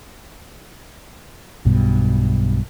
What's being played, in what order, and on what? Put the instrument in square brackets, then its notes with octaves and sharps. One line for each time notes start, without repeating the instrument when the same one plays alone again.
[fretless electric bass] B1 G2 B2